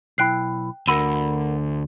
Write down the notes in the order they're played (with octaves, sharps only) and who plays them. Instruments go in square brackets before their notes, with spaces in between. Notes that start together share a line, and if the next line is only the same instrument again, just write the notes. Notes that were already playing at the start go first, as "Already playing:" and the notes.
[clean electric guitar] B1 E4 [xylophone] G5 F#6 C7
[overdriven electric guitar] D2 [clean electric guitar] A#4 F#5 B5 [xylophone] E6 D#7